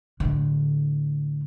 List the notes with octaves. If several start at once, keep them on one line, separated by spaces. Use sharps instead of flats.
A2 D3